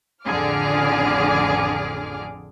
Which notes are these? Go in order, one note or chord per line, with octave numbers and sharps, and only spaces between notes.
A1 F2 D3 G#4 D6 F6